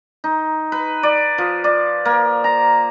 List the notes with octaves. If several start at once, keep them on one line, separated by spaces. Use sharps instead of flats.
D#4
B4
D5
F3
D5
A#3
A#5